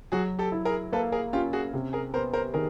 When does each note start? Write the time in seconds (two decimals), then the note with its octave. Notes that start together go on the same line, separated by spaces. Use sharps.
0.12 F#3 F#4 G#4
0.39 G4 A4
0.52 E4
0.65 G#4 A#4
0.92 A#3 A4 B4
1.12 G#4 A#4
1.33 C#4 F4 G4
1.53 F#4 G#4
1.73 C3
1.93 G#4 A#4
2.13 B3 A#4 C5
2.33 A#4 C5
2.54 D#3 G#4 A#4